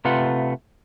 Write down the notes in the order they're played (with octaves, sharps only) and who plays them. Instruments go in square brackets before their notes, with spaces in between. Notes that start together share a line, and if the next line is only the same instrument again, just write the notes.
[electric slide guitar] C3 A3 F4 B4 F#5